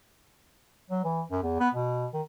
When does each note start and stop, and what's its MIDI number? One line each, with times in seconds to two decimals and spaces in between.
0.90 1.03 54
1.05 1.22 52
1.31 1.41 42
1.43 1.58 40
1.60 1.69 59
1.74 2.07 47
2.13 2.21 51